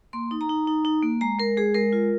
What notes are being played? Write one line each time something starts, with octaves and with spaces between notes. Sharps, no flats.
A#3 C6
D#4
A#5
D#4
D#4
D#4
A#3
G#3 A#5
G#3 A#4
G#3 G#4
G#3 A#4
F4